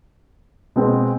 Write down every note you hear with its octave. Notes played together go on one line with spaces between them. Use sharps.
B2 G#3 C4